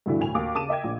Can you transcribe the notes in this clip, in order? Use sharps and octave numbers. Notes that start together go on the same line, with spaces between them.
G2 B2 D3 E3 A3 E4
D2 A2 G#5 F7
D#2 D6
C#3 A5 D6 D#7 E7
D#5 E5 G5 G#6
A#1